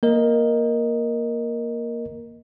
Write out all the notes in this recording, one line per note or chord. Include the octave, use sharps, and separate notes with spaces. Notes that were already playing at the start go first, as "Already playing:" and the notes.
A#3 A#4 D#5